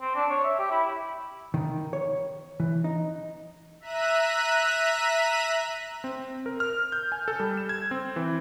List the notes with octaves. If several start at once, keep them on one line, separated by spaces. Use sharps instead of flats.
C4
D4
C#5
E5
G4
E4
D#3
C#5
E3
D#4
E5 A#5 F#6 B6 D#7
C4
A#4
F6
G6
G#5
A4
G3
E7
G#6
C4
E3